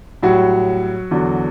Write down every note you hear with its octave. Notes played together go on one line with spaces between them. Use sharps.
A2 F#3 G3 F#4
E2 D3 F#3